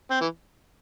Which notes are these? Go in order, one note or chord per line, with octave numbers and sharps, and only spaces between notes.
C4
E3